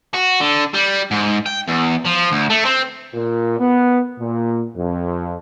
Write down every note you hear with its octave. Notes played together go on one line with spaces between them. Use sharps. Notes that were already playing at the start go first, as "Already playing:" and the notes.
F#4
D3
G3
G#2
G5
E2
F3
D2
A3
C4
A#2
B3
A#2
F2